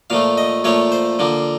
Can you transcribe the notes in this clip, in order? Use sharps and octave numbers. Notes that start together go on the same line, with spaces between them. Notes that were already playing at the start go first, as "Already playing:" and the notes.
A#2 F3 A3 F5
D#5
A#2 F3 A3 C#5
C5
D3 F3 A#3